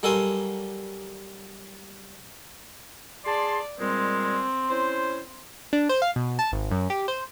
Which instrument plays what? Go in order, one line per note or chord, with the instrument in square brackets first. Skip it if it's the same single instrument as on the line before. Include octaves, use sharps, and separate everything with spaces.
[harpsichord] F#3 G3 A4 A#4 G#5 C6
[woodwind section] G#4 A5 C6 [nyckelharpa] D5
[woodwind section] A#2 G3 G#3 [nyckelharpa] C4
[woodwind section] C#4 E4 C5
[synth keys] D4
C5
F5
B2
A5
G#1
F#2
G4
C5